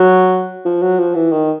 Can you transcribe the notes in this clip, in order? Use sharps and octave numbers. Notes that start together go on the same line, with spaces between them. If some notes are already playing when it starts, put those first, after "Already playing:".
Already playing: F#3
F3
F#3
F3
E3
D#3